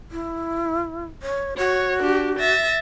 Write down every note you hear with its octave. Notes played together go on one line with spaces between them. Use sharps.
E4
C#5
F#4 C#5
D4 G4
E5 A6 A#6